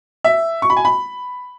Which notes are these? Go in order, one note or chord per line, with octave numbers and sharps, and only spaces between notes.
E5
C#6
B5
G#5
B5